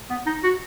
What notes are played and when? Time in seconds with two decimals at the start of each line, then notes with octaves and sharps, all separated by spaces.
0.10 B3
0.27 D#4
0.44 F#4